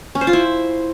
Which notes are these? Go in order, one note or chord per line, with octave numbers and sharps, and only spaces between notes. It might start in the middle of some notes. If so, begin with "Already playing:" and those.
C#4
C5
F4
E4